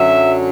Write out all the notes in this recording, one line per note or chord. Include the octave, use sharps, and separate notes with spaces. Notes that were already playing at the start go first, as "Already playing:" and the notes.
Already playing: F#2 D3 F#3 E5